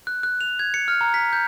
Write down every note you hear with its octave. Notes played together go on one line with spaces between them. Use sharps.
F#6
F#6
F7
G#6
C#7
F6
A#5
B6
G6